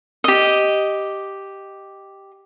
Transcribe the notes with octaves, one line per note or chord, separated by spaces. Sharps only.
G4 D#5